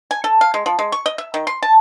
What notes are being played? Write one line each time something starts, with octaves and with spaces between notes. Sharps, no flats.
G#5
A4
F5
G#3
F3
G#3
C#6
D#5
E5
D#3
C6
A5